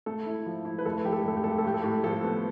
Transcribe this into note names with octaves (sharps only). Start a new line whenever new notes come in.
A3 A4
E4
F3
E4
B4
F1 A4
F1 G4
A4
G4
F1 A4
G4
F1 A4
G4
A4
A2 G4
A4
A2 G4
F3 A4
B3